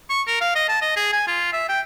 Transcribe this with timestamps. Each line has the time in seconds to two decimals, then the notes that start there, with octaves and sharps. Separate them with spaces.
0.10 C#6
0.27 A#4
0.41 F5
0.55 D#5
0.68 A5
0.81 D#5
0.96 G#4
1.13 G#5
1.27 F4
1.53 E5
1.69 G5